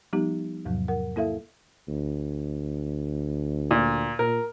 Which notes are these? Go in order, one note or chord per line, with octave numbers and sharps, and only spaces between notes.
F3 G3 B3 D#4 G4
E2 G#2 C3 F3 F#3
A#4 F#5
A#3 E4 A4 E5 F5
D2
A#2
A#2 A#4